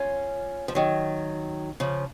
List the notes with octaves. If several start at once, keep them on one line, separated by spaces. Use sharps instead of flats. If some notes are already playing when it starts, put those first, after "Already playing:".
Already playing: C#4 F4
F3
D#3 F#3
C#3 F3